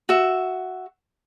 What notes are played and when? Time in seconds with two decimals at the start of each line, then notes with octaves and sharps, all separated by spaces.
0.09 F#4 E5